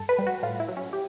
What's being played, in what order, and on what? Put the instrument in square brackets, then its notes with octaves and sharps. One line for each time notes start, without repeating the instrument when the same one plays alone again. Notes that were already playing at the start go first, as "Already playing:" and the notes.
Already playing: [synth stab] G2 A4
B4
G3
F#4
A2 F4
E4
F#3
C#4
G4